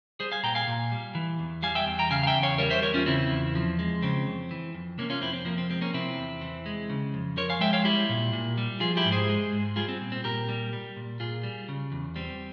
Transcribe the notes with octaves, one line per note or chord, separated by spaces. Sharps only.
G3 G#4 C5
F5 G#5
A#2 G5 A#5
F5 G#5
A#2
G3
E3
E2
G3 F5 G#5
E5 G5
E2
G5 A#5
C#3 F5 G#5
F5
E5 G5
E2
C#5 F5
G3 A#4 C#5
C5 E5
E2 A#4 C#5
C#4 F4
C#3 C4 E4
E2
F3
G#3
C#3 C4
F2
E3
F2
C3 A#3 C#4
C#4 F4
F2 C4 E4
C4
F3 A#3
C4
G#3 C4
A#3 C#4
C3 C4 E4
E2
E3
G#3
C#3
F2
F3 A#4 C#5
F5 G#5
G#3 E5 G5
C#5 F5
G3 E4 G4
A#2
A#2
G3
F3 F4 G#4
E4 G4
G#2
G#4 C5
G#3
G#2
G3 F4 G#4
C4
A#2
C4
A#2 G4 A#4
G3
G3
A#2
A#2 F4 G#4
G3
C#3
E2
G3 C4